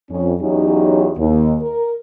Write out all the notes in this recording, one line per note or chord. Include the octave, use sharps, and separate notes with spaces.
F2 C#4
E2 F#3 C#4 D#4 G4
D#2
A#4